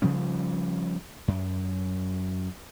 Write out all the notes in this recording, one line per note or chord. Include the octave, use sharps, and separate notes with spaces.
C#3 F3 G3 C#4
F#2